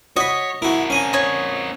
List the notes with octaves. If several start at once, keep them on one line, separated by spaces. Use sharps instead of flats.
F#4 C#5 D#5 B5
C4 E4 F#4 A#4
C#4 G#5 A#5
C#5 D#5